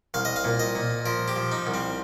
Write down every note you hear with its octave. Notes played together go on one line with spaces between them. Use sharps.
C2 F5
D#5
F5
A#2
D#5
A#2
F3 A#4
G4
F3
D#4
C2
C4